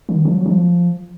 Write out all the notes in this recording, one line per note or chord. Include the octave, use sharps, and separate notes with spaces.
D#3
F3
F#3
F3